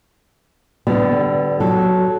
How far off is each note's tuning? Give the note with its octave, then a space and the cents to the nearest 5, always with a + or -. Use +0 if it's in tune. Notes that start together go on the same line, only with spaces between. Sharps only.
D3 +0 G3 -20 B3 +20
F#3 +0 A4 -10